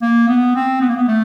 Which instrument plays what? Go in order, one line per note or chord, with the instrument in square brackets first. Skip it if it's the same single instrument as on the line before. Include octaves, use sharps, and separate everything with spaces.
[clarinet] A#3
B3
C4
B3
A#3
B3
A3